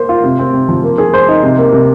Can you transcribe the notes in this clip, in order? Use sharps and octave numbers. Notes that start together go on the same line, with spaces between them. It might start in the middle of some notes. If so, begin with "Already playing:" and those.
Already playing: A#3 C5
F4
C3
C4
C3
F3
A#3
G#4
C5
D#4
C3
A#3
C3